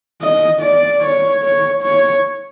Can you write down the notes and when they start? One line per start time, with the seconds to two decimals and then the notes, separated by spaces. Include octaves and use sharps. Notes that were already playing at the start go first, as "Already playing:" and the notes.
0.21 D#5
0.61 D5
1.01 C#5
1.42 C#5
1.82 C#5